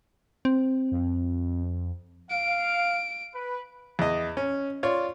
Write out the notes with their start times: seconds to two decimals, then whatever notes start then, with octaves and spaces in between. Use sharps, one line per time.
0.45 C4
0.91 F2
2.30 F5 D7
3.34 B4
3.99 E2 D#5
4.37 C#4
4.83 F4 C#5 D5